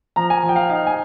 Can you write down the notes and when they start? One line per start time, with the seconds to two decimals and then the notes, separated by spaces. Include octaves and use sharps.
0.16 F3 A#5
0.30 G#5
0.43 F3
0.49 G5
0.56 F5
0.69 D#4 F5
0.87 G#5